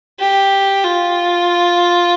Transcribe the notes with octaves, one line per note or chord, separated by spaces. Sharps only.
G4
F4